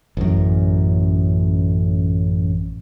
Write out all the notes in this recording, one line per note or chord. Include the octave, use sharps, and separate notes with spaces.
A1 F#2